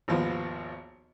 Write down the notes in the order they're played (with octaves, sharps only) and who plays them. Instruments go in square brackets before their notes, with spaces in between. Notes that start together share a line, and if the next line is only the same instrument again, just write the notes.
[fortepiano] G#1 D#2 F3 B3 F4